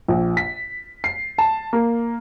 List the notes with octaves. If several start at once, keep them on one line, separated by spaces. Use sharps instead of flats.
A#1
B6
C7
A5
A#3